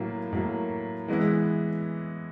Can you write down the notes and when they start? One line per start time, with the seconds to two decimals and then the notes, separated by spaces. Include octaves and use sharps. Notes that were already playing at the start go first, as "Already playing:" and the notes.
Already playing: A2 F#3 A#3
0.32 A2 F#3 A#3
1.08 E3 G#3 B3 E4